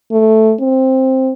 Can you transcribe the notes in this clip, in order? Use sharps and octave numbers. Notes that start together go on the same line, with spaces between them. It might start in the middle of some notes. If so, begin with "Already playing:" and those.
A3
C4